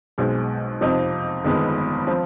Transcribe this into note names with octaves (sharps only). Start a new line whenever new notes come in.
B1 B2 G#3 C4
F2 C3 F3 C4 D#4
G1 F2 D#3 G#3 B3
F3 C4